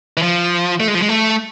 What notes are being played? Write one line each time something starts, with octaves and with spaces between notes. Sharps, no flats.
E3
F3
A3
G#3
F3
G#3
A3